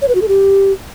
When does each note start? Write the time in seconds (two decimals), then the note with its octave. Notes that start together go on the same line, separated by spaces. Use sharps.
0.02 C#5
0.08 B4
0.15 F#4
0.22 A4
0.28 G4